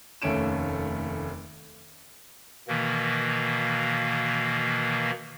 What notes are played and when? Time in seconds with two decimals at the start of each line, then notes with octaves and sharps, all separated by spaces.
0.22 F1 D#2 A3 C#4 D7 E7
2.68 B2 D#3 E3 A#3